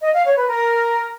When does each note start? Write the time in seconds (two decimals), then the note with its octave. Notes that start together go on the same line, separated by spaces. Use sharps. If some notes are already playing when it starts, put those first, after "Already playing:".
0.02 D#5
0.13 F5
0.25 C#5
0.36 B4
0.48 A#4